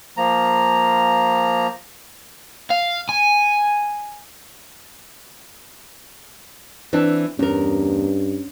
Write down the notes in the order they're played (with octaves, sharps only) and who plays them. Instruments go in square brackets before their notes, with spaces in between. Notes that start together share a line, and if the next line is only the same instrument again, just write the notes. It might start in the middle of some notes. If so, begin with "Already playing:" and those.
[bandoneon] F3 A#3 A#5
[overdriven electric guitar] F5
G#5
[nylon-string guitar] E3 C4 D4
[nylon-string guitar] E2 A#4 [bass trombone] G2 [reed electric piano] C#4